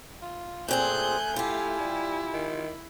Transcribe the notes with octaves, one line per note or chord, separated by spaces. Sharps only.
F4
A#2 A3 C4 G#4 G#5 F#6 G6
E4 F4 G4
G3
D#3